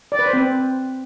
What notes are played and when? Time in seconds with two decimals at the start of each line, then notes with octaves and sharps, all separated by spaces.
0.12 D5
0.19 B4
0.26 C5
0.33 C4